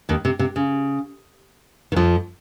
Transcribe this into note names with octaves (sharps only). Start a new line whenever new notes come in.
D#2 D#3
C3
C3
C#3
D#3
F2 F3